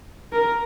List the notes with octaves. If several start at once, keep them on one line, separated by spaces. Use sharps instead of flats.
A#4